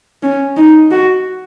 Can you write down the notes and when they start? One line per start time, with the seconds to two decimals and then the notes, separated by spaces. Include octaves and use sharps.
0.23 C#4
0.57 D#4
0.91 F#4